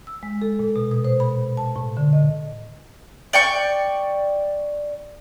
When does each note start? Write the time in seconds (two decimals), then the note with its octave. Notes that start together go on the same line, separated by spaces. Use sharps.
0.07 E6
0.23 G#3
0.42 A4
0.59 A#2
0.76 B2
0.91 D#6
1.05 C5
1.20 B5
1.57 A5
1.76 A2
1.97 D3
2.13 D#5
3.33 D5 G5 C#6